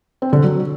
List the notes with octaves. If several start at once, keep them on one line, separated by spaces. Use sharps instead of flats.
C4
D3
F#3